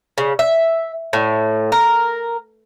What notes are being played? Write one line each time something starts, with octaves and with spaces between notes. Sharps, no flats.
C#3
E5
A2
A#4